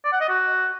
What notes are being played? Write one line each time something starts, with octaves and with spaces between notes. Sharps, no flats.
D5
F#5
D#5
F#4